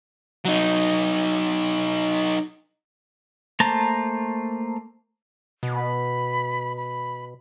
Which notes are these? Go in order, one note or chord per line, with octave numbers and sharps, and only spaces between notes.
F#3 D#4
A3 A#3 C5 A5 A#5
B2
B5
B5